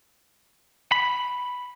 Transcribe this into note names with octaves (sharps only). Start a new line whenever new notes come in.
B5